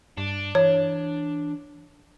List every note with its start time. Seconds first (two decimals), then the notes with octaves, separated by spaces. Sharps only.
0.18 G2 D4
0.55 E3 C#5